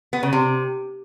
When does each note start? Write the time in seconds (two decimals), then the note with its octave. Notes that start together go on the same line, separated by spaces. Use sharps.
0.13 B3
0.23 C#3
0.33 C3